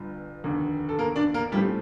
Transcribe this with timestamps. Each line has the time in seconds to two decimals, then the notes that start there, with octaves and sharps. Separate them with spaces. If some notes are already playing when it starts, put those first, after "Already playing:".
Already playing: G1 G2 F3
0.44 F1 D#2 D3
0.89 A4
0.99 A#3 A#4
1.16 D4 D5
1.34 A#3 A#4
1.52 A#1 A2 G3 A3 C4 G4